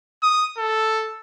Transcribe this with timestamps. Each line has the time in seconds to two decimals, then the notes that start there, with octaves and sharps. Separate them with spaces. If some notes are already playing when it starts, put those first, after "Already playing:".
0.23 D#6
0.58 A4